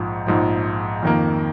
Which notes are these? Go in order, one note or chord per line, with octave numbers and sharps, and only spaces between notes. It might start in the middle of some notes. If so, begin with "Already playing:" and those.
Already playing: A#1 G#2 F3
A#1 G#2 F3
F2 D#3 A#3